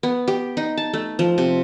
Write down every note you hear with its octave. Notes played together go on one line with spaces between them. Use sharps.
B3
G4
D#4
A5
A3
F3
C3